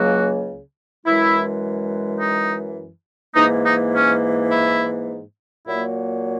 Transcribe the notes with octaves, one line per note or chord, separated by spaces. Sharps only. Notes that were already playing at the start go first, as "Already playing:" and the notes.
Already playing: C#2 C#3 F#3 A#3 F#4
F#2 E3 G#3 E4
D#4
G#2 E3 A#3 D#4
D#4
C#4
E4
A#2 F#3 A#3 E4